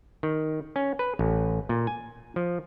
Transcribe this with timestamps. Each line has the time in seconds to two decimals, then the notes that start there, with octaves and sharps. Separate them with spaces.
0.23 D#3
0.76 C#4
0.99 B4
1.19 A1
1.69 A#2
1.87 G#5
2.36 F3